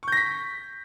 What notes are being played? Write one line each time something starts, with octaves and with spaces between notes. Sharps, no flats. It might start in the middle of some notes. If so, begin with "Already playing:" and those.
C#6 G6 A#6 B6